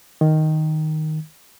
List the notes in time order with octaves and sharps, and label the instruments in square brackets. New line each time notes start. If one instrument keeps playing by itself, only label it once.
[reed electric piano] D#3